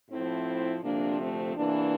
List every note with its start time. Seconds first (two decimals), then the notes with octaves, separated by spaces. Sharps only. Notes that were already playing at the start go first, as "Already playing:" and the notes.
0.10 A2 F3 C4 E4
0.83 D2 C3 F3 A#3 D4
1.20 A3 C4
1.56 E2 C3 E3 A#3 D4